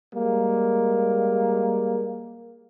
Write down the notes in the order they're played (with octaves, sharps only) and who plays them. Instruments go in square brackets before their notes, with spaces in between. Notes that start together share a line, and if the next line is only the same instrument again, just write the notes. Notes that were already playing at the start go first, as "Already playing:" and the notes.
[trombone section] G3 G#3 A#3